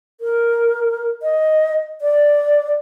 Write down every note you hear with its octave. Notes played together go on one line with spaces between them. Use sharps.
A#4
D#5
D5